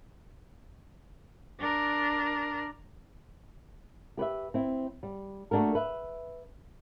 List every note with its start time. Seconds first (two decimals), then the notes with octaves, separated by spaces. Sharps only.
1.59 D4 A#4
4.17 G4 B4 C#5 E5
4.54 C4 E4
5.03 G3
5.51 A3 A#3 D4 F#4 A#4
5.75 B4 E5